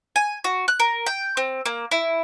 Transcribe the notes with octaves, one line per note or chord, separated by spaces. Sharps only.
G#5
F#4
F#6
A#4
G5
C4
A#3
E4